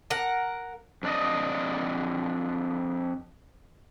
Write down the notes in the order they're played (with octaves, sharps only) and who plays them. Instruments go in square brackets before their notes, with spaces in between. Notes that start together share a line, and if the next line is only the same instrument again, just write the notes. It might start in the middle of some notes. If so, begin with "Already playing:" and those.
[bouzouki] A#4 F#5
[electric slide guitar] F2 D4 D5 D#5